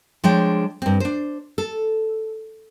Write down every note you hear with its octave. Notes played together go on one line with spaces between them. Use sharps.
F3 G#3 D4 C#5 G5
G2 C4
D4 C5
A4